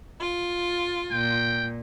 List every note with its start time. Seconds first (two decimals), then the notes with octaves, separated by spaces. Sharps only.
0.19 F4
1.11 A#2 G5